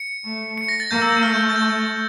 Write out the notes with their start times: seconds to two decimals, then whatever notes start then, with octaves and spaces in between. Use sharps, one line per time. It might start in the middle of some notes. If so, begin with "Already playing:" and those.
Already playing: C#7
0.25 A3
0.58 C#7
0.69 A#6
0.80 A6
0.91 A#3 G6
1.02 E6
1.12 G6
1.23 A3 F6
1.34 G6
1.50 A6
1.56 G6